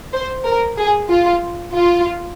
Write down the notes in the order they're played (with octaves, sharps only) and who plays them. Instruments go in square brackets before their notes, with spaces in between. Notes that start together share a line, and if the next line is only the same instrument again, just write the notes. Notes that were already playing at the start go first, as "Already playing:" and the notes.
[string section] C5
A#4
G#4
F4
F4